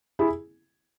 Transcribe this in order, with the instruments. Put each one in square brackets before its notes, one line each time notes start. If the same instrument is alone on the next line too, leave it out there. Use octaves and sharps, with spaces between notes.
[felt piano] E4 G#4